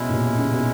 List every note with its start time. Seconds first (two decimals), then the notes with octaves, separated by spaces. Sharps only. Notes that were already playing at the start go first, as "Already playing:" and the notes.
Already playing: B2 G#3 C#4 E4
0.09 A#2
0.14 B2
0.38 C#3
0.53 B2